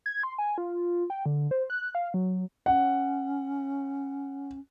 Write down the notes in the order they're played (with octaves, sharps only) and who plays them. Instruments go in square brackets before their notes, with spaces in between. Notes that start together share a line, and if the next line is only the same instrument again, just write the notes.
[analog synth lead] G#6
C6
G#5
F4
G5
D3
C5
F#6
F5
F#3
[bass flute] C#4 [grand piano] F#5